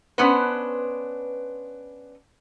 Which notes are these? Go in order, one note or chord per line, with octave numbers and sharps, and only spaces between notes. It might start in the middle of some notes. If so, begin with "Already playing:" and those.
B3 C#4 D4 B4 C5